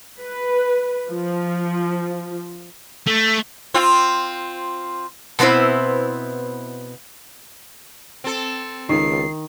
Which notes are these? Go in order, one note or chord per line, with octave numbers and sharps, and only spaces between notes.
B4
F3
A3
C4 F4
B2 B3 C4 E4 C5
C4 A4
C#2 D#3 C7